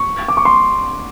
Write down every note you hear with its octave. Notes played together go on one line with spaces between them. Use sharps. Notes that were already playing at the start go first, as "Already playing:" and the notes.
Already playing: C#6
D6
C#6
C6